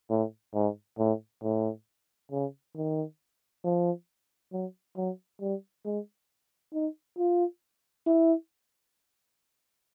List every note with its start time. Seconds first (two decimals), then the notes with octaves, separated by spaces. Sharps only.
0.10 A2
0.54 G#2
0.99 A2
1.43 A2
2.31 C#3
2.76 D#3
3.64 F3
4.52 F#3
4.97 F#3
5.41 G3
5.85 G#3
6.74 D#4
7.18 F4
8.06 E4